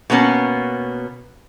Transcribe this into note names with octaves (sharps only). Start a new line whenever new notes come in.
B2 A#3 B3 C#4